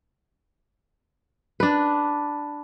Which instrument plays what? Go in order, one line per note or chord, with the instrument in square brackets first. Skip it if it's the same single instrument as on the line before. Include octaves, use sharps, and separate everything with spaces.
[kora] D4 B4